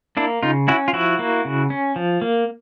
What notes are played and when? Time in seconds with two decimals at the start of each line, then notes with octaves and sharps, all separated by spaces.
0.17 A#3 D4 E4
0.43 C#3 D#4 F4
0.68 C#4 E4 F#4
0.88 F4
0.93 F3 E4 F#4
1.19 A#3
1.45 C#3
1.70 C#4
1.96 F3
2.22 A#3